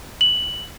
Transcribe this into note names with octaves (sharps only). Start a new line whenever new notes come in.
F#7